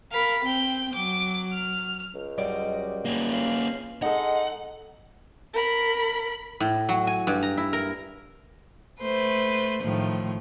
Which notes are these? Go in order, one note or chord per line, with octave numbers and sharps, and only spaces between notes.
A#4 F5 B5
C4 G5 G6
F#3 D6
F6
C#2
F#2 G3 D5 D#5
A#3 C#4
F5
G#3 D#4 A4 D#5 F#5
A#4 B5
A2
F#3
G#5
G2
A#5
E4
A#4
A3 B4 C5
A2 D#3 F3